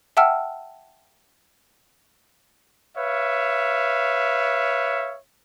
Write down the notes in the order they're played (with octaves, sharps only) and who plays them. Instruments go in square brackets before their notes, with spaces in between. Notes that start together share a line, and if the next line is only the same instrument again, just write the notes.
[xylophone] E5 F#5 G5 A5 E6 F6
[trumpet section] B4 C#5 E5 F5